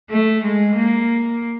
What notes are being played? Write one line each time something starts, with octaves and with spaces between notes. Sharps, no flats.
A3
G#3
A#3